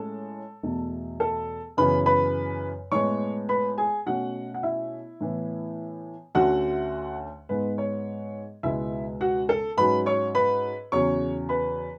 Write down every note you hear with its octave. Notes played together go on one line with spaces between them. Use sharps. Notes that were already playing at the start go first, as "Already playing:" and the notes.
Already playing: A2 G#3 C#4 A4 A5
E2 B2 A3
A4 A5
F#2 C#3 E3 B3 B4 B5
B4 B5
A2 G#3 B3 C#5 C#6
B4 B5
G#4 G#5
B2 A3 C#4 F#4 F#5
F#5
E4 E5
A2 E3 B3
D2 D3 A3 C#4 F#4 F#5
G#2 G#3 B3 B4
C#5
C#2 B2 G#3 B3 E4 E5
F#4 F#5
A4 A5
G#2 F#3 C#4 B4 B5
C#5 C#6
B4 B5
E2 C#3 F#3 C#4 C#5 C#6
B4 B5